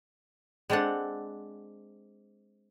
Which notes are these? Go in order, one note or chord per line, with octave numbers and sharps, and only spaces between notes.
G#3 C4 D4 A4 F#5